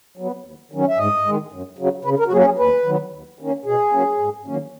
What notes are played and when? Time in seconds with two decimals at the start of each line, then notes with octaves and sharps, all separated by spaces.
0.17 F#3 B3
0.44 D#2
0.72 D#3 F#3 C#4
0.88 E5
0.98 G#2 D#5
1.25 D#3 G#3
1.52 F#2
1.78 C#3 F#3
2.05 C#3 B4
2.19 A#4
2.28 F#4
2.32 F#3 A#3 C#4 G#4
2.45 G#4
2.58 D#2 B4
2.85 D#3 F#3 B3
3.12 D#2
3.39 D#3 A#3 C#4
3.65 B2 G#4
3.93 F#3 A#3 C#4
4.19 G#2
4.45 D#3 F#3 A#3 C#4